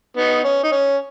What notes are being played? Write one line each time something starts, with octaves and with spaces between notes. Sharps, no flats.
B3 D#4
C#4
D#4
C#4